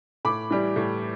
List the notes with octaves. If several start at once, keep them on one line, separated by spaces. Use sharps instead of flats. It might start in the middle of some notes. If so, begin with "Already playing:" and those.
A2 B5 D6
E3 G3
A2